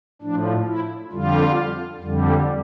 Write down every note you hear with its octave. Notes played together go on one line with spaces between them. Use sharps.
A2 F3 D4
E4
F2 D3 G3 F4
F2 D3 G3